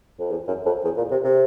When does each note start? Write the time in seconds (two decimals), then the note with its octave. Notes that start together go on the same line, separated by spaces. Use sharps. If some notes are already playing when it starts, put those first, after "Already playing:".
0.19 F2
0.30 E2
0.48 F#2
0.66 F2
0.84 E2
0.97 A#2
1.11 C3
1.24 C3